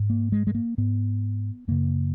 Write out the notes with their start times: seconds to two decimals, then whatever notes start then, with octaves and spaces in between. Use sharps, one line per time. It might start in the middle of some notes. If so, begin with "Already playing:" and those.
Already playing: G#2
0.10 A#3
0.32 G#3
0.47 G#3
0.55 A#3
0.78 G#2 B3
1.68 F#2 C#3 A#3